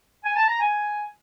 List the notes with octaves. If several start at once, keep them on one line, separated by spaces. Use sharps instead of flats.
G#5
A5
A#5
G#5